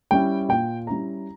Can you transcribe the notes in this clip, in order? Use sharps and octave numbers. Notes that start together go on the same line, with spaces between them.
G3 C#4 E4 G5
A#2 G5
G3 C#4 E4 A#5